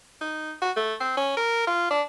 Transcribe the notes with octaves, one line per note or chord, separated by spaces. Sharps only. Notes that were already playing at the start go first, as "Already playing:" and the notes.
D#4
F#4
A3
C4
C#4
A#4
F4
D4